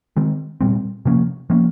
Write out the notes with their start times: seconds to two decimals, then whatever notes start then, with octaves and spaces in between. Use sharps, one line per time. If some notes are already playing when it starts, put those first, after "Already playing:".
0.17 D#3 G#3 C4
0.61 A#2 G3 C4
1.05 C3 F3 A#3 C#4
1.50 F3 A#3 C#4